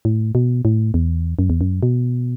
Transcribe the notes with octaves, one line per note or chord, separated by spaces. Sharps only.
A2
B2
A2
E2
F#2
E2
F#2
B2